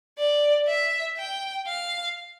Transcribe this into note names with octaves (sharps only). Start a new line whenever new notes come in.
D5
E5
G5
F5